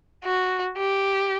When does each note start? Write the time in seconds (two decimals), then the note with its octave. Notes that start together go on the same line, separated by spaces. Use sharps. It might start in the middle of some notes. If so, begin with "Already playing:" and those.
0.24 F#4
0.77 G4